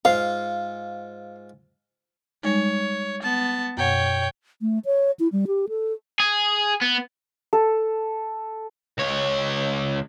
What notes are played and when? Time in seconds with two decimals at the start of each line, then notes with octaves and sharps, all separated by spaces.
0.05 G#2 F4 F5
2.43 G3 G#3 D#4 C#5
3.23 B3 A5
3.77 F#2 B2 C#5 F#5 G5
4.61 A3
4.85 C#5
5.20 E4
5.32 G3
5.47 G4
5.69 A4
6.20 G#4
6.82 B3
7.53 A4
8.98 C#2 C#5